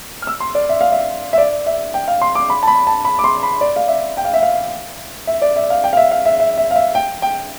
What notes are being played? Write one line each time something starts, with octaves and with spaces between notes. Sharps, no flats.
F6
E6
C6
D5
E5
F5
E5
E5
D5
E5
G5
F5
C6
D6
B5
A5
B5
A5
B5
D6
C6
B5
D5
F5
E5
G5
F5
E5
F5
E5
D5
E5
F5
G5
F5
E5
F5
E5
E5
E5
F5
E5
G5
G5